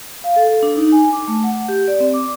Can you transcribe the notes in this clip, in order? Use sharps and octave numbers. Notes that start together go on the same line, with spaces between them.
F5
A4
D4
D#4
G#5
D6
A3
F#5
G4
D5
C4
D6